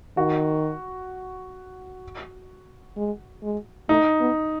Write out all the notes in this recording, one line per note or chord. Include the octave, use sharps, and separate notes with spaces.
D#3 F#4
G#3
G#3
A3 D#4
B3